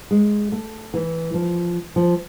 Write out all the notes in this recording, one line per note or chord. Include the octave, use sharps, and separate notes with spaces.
G#3
A3
E3
F3
F3